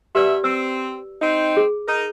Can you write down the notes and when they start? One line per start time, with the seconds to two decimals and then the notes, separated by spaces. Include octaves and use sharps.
0.15 B2 B3 G4 B4 D5 E5
0.44 C4 E6
1.21 C4 D#4
1.57 G#4
1.88 D#4 A#4